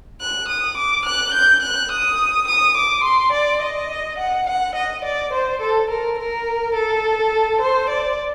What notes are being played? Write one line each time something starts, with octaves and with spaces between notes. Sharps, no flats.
F#6
D#6
D6
F#6
G6
F#6
D#6
D#6
D6
C6
D5
D#5
F#5
F#5
D#5
D5
C5
A4
A#4
A#4
A4
C5
D5